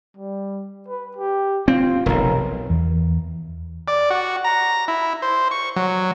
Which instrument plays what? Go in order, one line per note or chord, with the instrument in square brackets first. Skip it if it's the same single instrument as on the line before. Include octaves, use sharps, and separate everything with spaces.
[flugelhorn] G3
B4
G4
[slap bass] C4 [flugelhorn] F4
[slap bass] F1 B1 [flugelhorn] A#4
[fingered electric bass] E2
[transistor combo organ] D5
F#4
A#5
E4
C5
C#6
F#3